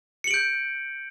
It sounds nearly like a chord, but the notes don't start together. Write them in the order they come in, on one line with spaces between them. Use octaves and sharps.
C#7 F#7 D7 G6